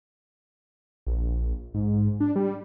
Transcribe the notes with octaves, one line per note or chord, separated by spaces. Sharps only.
A#1
G#2
D4
G3